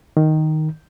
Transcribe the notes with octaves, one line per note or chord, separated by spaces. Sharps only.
D#3